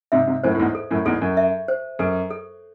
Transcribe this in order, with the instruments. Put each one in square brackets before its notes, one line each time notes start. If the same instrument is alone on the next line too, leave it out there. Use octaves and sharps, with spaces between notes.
[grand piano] G#2 C3 [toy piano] E5
[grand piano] G#2 C3
[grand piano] F#2 A2 [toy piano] C5
[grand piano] A2
E2 G#2
[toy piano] A4
[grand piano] F#2 A2
[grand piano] E2 G#2 [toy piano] A4
[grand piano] F#2
[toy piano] E5
C5
[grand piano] F#2 [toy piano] A4
[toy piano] A4